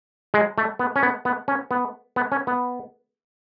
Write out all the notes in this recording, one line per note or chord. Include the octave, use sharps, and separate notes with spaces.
G#3
A3
B3
C#4
B3
B3
C#4
B3
B3
C#4
B3